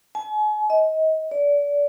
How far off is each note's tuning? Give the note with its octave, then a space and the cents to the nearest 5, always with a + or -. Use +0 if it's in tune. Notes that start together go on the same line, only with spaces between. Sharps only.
G#5 +40
D#5 +30
D5 -30